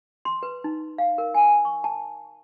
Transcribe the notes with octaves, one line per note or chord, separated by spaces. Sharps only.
C6
B4
D#4
F5
A#4
G#5
C#6
A5